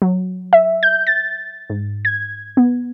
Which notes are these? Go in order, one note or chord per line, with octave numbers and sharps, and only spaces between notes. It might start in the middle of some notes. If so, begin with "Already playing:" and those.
F#3
E5
G6
A6
G#2
G#6
B3